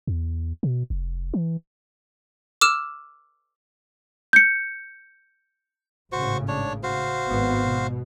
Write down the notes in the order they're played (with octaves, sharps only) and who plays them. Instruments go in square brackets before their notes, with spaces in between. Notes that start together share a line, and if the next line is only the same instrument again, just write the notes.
[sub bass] E2
B2
F1
E3
[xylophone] D6 E6 F6 E7
[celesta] G6 C#7
[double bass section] G#1 A2 C#3 [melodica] F#4 C5 C#6
[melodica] D4 C#5
F#4 C5 F5
[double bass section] G#1 B3
B2